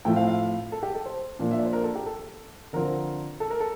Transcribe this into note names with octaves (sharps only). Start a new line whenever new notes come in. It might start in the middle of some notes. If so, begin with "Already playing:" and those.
A2 F3 A3 C4 G5
F5
F5
A4
G4
A4
C5
A#2 F3 A#3 D4
E5
D5
C5
A#4
A4
G4
A4
D3 F3 C4 A#4
A4
A#4
A4